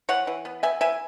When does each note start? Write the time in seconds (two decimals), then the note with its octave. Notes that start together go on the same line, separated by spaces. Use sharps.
0.09 E3 C#5 F#5
0.27 E3
0.45 B3
0.63 B3 E5 G#5
0.81 E3 E5 G#5